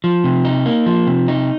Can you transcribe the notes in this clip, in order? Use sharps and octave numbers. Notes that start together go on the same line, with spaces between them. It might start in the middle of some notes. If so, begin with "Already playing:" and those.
F3
C3
D#4
A#3
F3
C3
D#4